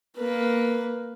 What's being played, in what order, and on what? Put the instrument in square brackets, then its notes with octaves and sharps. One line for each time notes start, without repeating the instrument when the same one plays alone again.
[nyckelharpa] A#3 B4